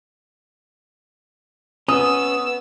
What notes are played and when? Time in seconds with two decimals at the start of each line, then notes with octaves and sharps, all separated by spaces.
1.88 B3 C#4 D#6 E6